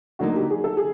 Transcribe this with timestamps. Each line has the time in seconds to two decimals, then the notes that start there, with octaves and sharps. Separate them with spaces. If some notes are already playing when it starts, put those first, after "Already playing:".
0.19 D3 F#3 A#3 D#4 F#4
0.35 G4
0.51 G#4
0.64 A4
0.77 G#4